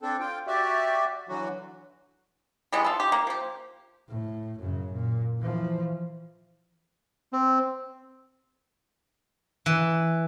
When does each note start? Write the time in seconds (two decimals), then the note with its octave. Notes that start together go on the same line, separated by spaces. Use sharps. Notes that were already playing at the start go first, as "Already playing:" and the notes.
0.02 C4 D4 A4
0.20 F4 G5
0.47 F#4 G4 D5 E5
1.29 D3 E3 F#3 F#4
2.72 E3 G3 G#3 B3
2.84 F4 A4
3.00 G4
3.12 A#3
3.27 F3 G4
4.08 A2
4.59 F#2 C#3
4.92 A#2
5.39 E3 F3
7.33 C4
9.66 E3